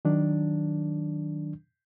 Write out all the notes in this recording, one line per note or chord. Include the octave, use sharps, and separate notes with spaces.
D#3 F#3 D4